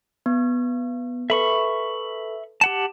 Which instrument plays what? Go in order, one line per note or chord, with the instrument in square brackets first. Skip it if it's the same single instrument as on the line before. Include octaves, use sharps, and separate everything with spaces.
[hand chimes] B3
[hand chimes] A4 B4 [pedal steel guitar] E5 B5 C#6
[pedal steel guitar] G4 F#5 A5